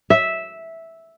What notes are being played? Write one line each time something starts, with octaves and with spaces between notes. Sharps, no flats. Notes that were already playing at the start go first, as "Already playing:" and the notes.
E5